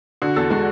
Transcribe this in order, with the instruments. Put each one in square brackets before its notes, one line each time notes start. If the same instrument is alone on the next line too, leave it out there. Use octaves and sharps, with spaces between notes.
[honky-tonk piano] D3 [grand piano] F#4
[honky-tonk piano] E2 [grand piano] A4
[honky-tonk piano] G#3 [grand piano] F#4